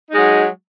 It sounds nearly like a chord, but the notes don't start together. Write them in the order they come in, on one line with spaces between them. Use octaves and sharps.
D#4 G#3 F#3